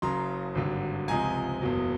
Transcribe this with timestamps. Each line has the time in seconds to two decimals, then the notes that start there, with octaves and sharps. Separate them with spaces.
0.02 F#1 F#2 C#3 F#3 A#5 C6
0.55 G#1 G2 D3 F#3
1.08 C#2 C3 F3 G#3 G#5 A#5
1.62 F#1 E2 B2 F#3